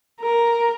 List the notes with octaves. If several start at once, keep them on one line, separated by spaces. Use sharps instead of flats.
A#4